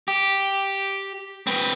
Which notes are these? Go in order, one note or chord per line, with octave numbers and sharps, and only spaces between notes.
G4
C4 B4